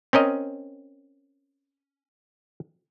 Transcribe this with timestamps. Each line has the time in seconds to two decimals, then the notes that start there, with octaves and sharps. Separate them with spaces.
0.13 C4 C#4 A#4 D#5